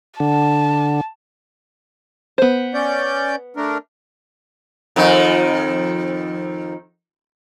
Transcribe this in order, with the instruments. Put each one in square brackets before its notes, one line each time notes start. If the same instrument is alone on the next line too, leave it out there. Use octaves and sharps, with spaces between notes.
[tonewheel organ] D3 [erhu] A5
[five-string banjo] B3 C5
[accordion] C#4 D5 G6
A3 D4 A#4
[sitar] F2 D#3